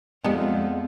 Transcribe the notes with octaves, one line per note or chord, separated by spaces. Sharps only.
F2 F3 G3 G#3 B3 D#4